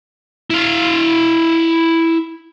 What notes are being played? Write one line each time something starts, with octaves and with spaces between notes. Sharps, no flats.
E4 F5